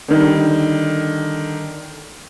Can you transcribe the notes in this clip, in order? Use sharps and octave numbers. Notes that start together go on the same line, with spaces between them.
D3 D#3 G3